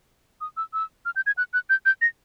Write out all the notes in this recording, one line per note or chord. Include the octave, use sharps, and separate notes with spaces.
D#6
E6
E6
F6
G6
G#6
F#6
F#6
G6
G6
A#6